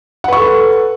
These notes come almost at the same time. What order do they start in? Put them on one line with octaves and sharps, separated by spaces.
F#5 B4 C#6 A4